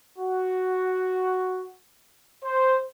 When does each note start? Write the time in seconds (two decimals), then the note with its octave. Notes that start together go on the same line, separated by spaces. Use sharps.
0.18 F#4
2.43 C5